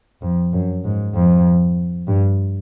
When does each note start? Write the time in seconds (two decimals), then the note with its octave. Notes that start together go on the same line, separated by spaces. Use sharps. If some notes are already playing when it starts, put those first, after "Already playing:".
0.22 F2
0.53 F#2
0.84 G#2
1.15 F2
2.08 G2